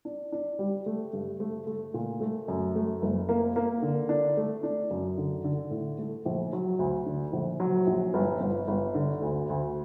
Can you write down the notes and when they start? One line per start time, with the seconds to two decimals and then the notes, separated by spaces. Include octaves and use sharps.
0.05 D4
0.32 D4
0.59 G3
0.86 A3
1.13 G2
1.40 A3
1.67 A3
1.94 A#2
2.21 A3
2.48 F#2
2.75 A3
3.02 F#1
3.29 A#3
3.56 A#3
3.82 D3
4.09 D4
4.37 A3
4.63 D4
4.91 F#2
5.17 D3
5.44 D3
5.71 A2
5.98 A3
6.25 A#1
6.53 F#3
6.79 D2
7.06 D3
7.33 A#1
7.60 F#3
7.87 A#1
8.14 G1
8.41 G1
8.68 G1
8.95 D3
9.22 D2
9.49 D2